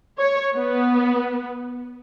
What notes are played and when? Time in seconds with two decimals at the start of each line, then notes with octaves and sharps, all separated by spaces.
0.20 C#5
0.56 B3